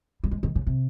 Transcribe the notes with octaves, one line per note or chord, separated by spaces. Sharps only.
G3
G#3
D#3
C#3
C3